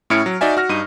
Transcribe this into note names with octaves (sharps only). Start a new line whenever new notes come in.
A2 C#4 E4 F6 C#7 D7
F#3
D#4 F#4 D5 E5 G#5
F#4 F6 A#6
G2 D#4 D#7